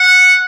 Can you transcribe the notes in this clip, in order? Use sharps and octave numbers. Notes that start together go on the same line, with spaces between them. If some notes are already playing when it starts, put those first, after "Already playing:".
Already playing: F#5